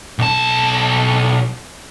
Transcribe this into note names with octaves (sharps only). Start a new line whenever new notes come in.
B1 A5